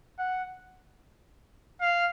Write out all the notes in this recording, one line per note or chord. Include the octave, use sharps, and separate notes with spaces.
F#5
F5